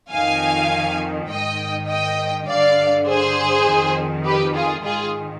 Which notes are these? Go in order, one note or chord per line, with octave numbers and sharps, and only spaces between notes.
F2 D#3 F5 G#5
G#2 D#5 G5
D#3
D#5 G5
G2 D3 D5 F5
G#4 C5
F2 D#3
G4 B4
F4 G#4
G#2 D#3 F4 G#4